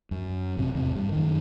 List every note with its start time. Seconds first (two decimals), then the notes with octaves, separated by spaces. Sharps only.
0.11 F#2
0.57 A1 C3
0.75 E2 C3
0.96 G2
1.12 F#2 D#3